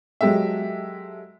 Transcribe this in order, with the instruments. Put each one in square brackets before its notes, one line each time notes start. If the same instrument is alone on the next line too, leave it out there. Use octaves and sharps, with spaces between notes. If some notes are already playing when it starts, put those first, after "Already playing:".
[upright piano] F#3 G#3 G4 A4 E5